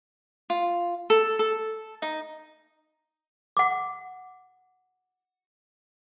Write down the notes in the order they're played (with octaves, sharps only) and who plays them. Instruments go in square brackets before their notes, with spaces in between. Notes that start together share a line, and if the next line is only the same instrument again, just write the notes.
[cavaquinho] F4
A4
A4
D#4
[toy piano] F#5 D6